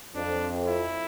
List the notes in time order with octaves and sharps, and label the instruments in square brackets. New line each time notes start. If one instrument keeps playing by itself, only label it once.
[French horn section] F2 [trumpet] D4
[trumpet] E4